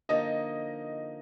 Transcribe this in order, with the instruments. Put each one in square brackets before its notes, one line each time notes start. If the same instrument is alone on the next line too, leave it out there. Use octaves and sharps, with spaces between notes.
[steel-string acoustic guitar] D3 F3 A#3 D#4 [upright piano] D#5